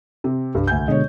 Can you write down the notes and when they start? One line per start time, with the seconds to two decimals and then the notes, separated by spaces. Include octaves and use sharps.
0.24 C3 C4
0.55 C2 G2
0.67 D2 G#5 G6
0.88 B2 D3 G#3 C#5 D#5